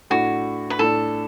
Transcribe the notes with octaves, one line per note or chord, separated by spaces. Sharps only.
A2 A3 D4 F#4
B4
A2 A3 D4 A4